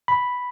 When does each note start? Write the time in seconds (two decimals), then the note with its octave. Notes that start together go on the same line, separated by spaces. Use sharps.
0.08 B5